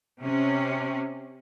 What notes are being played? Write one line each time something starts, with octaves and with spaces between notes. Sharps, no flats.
C3 C#4